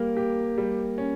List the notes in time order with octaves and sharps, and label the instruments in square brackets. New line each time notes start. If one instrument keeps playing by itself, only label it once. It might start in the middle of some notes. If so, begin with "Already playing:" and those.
Already playing: [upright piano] G3 [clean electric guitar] A#3
[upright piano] G4
G3
C#4